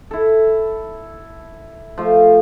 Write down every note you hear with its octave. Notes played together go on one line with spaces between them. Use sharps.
E4 A4
F3 A3